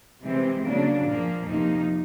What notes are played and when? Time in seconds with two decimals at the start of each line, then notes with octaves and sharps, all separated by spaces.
0.23 C3 E3 G#3 C4
0.64 C#3 F#3 A#3 D4
1.05 A#2 F3 A#3
1.45 F2 C3 F3 A#3 D#4